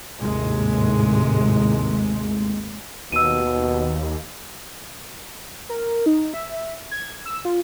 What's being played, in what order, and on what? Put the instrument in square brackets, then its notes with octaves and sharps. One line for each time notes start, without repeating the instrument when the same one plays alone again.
[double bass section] G#1 D#2 A2 C3 G#3
[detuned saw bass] D#2 [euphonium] B2 [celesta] E6 D#7
[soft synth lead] A#4
D#4
E5
G#6
E6
F4